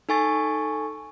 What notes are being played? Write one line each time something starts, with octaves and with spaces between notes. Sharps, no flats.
D#4 A4 G#5 C#6 A6